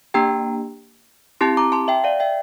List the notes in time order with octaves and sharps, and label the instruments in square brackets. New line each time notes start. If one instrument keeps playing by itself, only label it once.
[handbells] A#3 D4 G4 G5 A#5
C4 E4 G4 A5 C6
A#5 D6
A5 C6
E5 G5
D5 F5
E5 G5